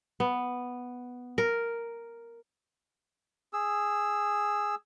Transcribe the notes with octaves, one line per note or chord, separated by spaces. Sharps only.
B3
A#4
G#4 E6